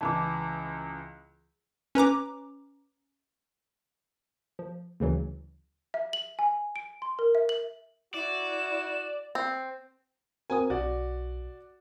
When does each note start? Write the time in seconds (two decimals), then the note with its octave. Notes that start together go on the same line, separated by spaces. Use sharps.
0.01 C#2 E3 A5 D6
1.95 C#4 B4 A#5 D6
4.59 F3
5.00 D2 C#3 E3 F#3
5.94 E5
6.13 F#7
6.39 G#5
6.76 D7
7.02 C6
7.19 A#4
7.35 E5
7.49 F#7
8.14 E4 F#4 D5 E7
9.35 C4
10.50 C4 F#4 A#4 G#5 D#6
10.70 B1 F#4 D5